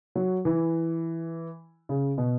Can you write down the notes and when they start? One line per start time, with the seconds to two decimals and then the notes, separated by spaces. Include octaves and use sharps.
0.16 F#3
0.45 E3
1.89 C#3
2.18 B2